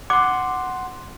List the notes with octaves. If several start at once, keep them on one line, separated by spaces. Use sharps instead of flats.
F#5 C6 D6